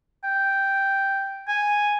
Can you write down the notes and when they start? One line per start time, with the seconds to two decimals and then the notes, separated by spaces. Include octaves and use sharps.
0.24 G5
1.48 G#5